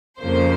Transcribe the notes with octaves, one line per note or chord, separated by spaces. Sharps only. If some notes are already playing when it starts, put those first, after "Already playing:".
F2 C#3 F3 A#3 C5